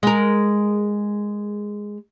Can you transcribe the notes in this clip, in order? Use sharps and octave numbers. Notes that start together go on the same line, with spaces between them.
G#3 A#4